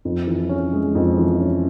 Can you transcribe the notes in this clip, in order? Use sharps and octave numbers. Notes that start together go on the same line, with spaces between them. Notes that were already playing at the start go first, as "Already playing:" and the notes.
F2
E3
C#4
G#3
F2
E3
C#4